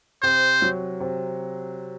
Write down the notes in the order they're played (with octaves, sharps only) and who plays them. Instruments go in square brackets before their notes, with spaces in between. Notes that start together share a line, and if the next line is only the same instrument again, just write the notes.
[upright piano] C3 [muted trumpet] C5
[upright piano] F#3
C3